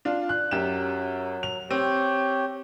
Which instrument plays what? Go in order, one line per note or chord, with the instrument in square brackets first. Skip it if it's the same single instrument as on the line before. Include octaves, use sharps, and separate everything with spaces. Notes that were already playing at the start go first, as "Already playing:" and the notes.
[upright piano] D4 F4
F#6
[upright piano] F#2 G4 E7 [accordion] F#3
[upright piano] F7
[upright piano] C4 [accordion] G4 C#5 G6